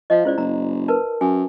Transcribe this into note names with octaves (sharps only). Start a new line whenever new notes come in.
F3 D#5 F5
C#2 E4 C5 D5
F#1 A#5
A#4 B4 A5
F#2 G#5